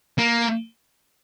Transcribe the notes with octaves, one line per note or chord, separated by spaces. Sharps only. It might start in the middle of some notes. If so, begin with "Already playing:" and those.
A#3